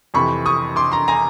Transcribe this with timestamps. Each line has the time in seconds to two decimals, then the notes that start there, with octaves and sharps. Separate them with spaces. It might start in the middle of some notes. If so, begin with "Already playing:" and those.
0.14 F2 C3 E3 B5 C#6
0.46 C#6 D#6
0.76 C6 D6
0.92 A#5 C6
1.08 G#5 A#5